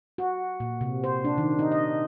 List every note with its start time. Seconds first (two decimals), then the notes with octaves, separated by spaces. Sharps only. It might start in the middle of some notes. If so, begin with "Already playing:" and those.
0.18 F#4
0.60 A#2
0.81 C3
1.04 C5
1.25 D4
1.38 D#3
1.59 D#4
1.72 D#5